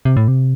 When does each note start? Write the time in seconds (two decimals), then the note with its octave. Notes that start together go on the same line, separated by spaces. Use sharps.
0.05 C3
0.17 A2
0.28 C3